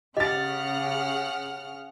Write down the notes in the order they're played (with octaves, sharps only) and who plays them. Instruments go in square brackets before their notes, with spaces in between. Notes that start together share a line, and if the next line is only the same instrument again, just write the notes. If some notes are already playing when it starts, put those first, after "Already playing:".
[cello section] C#3 [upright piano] G4 A6 [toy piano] D#5 [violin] F#5 F6